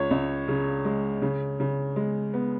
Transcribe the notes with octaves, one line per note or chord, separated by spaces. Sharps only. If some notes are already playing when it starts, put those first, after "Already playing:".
Already playing: C#2 C#5
C#2
C#3
G#3
C#3
C#3
G#3
B3